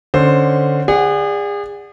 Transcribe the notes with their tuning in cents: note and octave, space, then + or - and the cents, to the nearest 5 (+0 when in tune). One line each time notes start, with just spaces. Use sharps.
D3 +10 C#4 +0 C5 +0
G#4 -35 D5 +0 F#5 +10